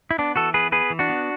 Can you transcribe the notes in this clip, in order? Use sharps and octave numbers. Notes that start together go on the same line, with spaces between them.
E4
B3 D4
E3 F#4 A4
B3 G#4 B4
B3 G#4 B4
E3
D4 F#4
B3